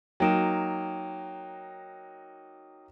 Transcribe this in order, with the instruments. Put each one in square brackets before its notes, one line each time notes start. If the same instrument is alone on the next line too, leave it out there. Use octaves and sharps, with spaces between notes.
[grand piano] F#3 A#3 D#4 [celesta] G5 D7 E7